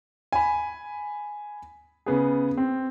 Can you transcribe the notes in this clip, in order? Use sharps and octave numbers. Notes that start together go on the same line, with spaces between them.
G#5 B5
C#3 B3 G#4
C4